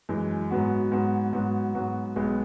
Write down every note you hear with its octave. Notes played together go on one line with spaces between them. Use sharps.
F#2 E3 G#3
G#2 F#3 B3 F#4
G#2 F#3 B3 F#4
G#2 F#3 B3 F#4
G#2 F#3 B3 F#4
B1 B2 G#3 B3